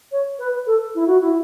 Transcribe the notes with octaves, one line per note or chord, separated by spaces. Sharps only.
C#5
B4
A4
E4
F#4
E4